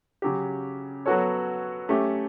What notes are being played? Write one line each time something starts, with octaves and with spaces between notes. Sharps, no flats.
C#3 F#3 C#4 G4
F#3 B3 F#4 A4 C#5
A3 C#4 G4